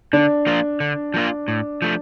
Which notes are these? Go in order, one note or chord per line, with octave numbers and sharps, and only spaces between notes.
D3 D4
F3 A#3 F4
D3
F3 A#3 F4
A2
F3 A3